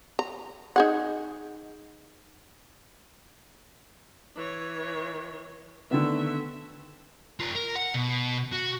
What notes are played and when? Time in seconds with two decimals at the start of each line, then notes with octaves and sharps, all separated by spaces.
0.19 A#5
0.76 D#4 G#4 F#5
4.36 E3 C#5
5.91 D3 D#3 A3 B3 E5
7.40 A3 F4
7.56 A#4
7.76 F#5
7.94 B2
8.52 F#4